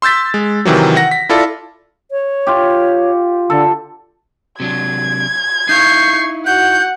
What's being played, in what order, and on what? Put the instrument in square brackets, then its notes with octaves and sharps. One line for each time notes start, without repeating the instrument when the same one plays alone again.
[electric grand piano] C6 E6 G6 A6 B6
G#3
C3 D#3 E3 F#3
F#5 A#6
B6
E4 F4 A4 D5
[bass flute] C#5
[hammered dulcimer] F4 G4
[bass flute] D3 [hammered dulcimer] A4
[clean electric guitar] C3 F#3 D4 [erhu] G#6
[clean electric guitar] D#4 E4 F5 [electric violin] C#6 C7 [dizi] G6
[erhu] F#4 [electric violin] F#5 [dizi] G6